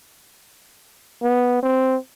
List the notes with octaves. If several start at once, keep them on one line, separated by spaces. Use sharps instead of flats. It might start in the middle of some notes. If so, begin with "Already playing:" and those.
B3
C4